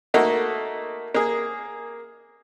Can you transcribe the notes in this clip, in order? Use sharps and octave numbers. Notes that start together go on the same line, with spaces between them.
A3 A#3 D#4 F#4
A#3 G#4